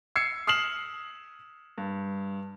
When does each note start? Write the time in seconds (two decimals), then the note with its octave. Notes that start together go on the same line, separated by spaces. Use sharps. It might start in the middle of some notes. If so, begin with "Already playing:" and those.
0.16 E6 G#6 C7 C#7
0.47 D#6 F6 C7 E7 F#7
1.78 G2